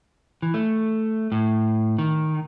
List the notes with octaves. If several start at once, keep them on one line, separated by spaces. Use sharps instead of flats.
E3
A3
A2
D#3